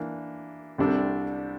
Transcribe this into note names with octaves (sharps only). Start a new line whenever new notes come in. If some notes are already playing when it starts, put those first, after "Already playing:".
Already playing: E3 A#3 D4
C2 C3 G3 D4 A4